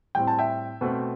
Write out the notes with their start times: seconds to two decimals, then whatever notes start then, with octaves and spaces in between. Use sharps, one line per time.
0.15 A2 G3 C4 G5
0.27 A5
0.39 E5 G5
0.81 B2 A3 C4